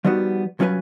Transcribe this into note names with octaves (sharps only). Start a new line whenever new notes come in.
F3 G3 B3 D#4 F#4
C2 F#3 C#4 F4 B4 G#5